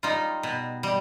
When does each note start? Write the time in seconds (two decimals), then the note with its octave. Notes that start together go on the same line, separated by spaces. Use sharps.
0.03 G3 D#4 F4
0.43 B2
0.83 G3